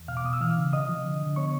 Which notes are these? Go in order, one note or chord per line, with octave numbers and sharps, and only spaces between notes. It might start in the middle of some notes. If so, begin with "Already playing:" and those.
Already playing: E2
B2 F5 F6
D6
B2 D#6
E6
E3 F5 F6
C#3
C3 D#5 D#6
F3
D3
D3
B3 C#5 C#6